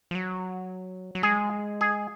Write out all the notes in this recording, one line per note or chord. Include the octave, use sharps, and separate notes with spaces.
F3
F#3
F#3
G#3 G#4
G#4